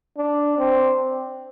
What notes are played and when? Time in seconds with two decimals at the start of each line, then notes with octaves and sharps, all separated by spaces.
0.18 D4
0.59 C4